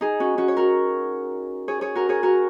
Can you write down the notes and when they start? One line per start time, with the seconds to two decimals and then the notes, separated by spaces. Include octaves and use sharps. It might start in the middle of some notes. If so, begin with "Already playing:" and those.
0.01 D#4 G#4
0.20 C#4 F#4
0.38 C#4 F#4
0.48 C#5
0.57 F#4 A#4
1.68 G#4 C#5
1.81 G#4 C#5
1.95 F#4 A#4
2.09 G#4 C#5
2.23 F#4 A#4